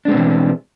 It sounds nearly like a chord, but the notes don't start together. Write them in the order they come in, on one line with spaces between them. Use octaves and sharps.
D4 G#3 C4 B2 E3